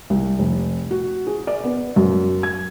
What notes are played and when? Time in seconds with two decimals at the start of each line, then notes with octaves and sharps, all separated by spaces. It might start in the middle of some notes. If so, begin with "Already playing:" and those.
0.10 C2
0.39 F1
0.91 F#4
1.27 G#4
1.47 D5
1.64 B3
1.96 F#2
2.43 G#6